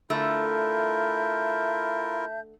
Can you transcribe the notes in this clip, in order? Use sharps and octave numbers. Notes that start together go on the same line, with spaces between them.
D3 A3 E4 F4 A#4 E5 A5 G6